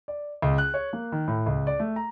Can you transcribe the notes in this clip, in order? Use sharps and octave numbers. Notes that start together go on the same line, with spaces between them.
D5
C#2
F#6
C#5
A#3
D#3
A2
C#2
D5
A3
A#5